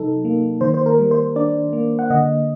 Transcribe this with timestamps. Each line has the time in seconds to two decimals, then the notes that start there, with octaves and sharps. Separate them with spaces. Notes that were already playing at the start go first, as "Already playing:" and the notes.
Already playing: C3 F#3 D#4 A4
0.25 A#3
0.61 D#3 C5
0.74 C5
0.86 A#4
0.99 G3
1.11 C5
1.36 D4 D5
1.73 A#3
1.99 F#5
2.10 D3 D#5